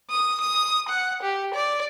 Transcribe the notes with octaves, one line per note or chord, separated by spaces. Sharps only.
D#6
D#6
F#5
G4
D5